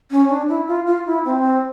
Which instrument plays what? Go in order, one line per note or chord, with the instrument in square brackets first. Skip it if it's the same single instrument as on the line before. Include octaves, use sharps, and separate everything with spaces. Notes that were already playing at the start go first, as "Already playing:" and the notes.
[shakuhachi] C#4
D4
E4
F4
F4
E4
C4